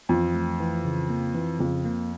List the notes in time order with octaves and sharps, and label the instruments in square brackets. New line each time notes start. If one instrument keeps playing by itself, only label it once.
[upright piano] F2 [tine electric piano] E3
[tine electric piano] A3
E3
C#3
A#3
E3
[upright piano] F2 [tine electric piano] C#3
[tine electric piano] A#3